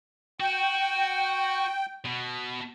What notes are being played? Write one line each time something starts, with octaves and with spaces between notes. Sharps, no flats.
F#4 G5
B2